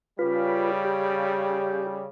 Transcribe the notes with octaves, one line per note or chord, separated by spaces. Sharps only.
C#3 G3 F4 B4
G4